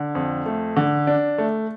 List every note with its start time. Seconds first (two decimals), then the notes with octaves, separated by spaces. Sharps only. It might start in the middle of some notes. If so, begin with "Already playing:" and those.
Already playing: D3
0.15 F2
0.46 A3
0.76 D3
1.07 D4
1.38 A3